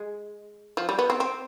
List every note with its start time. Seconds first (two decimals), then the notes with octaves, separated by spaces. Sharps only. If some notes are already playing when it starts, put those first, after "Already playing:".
Already playing: G#3
0.77 F3
0.89 G3
0.99 B3
1.10 C4
1.20 C4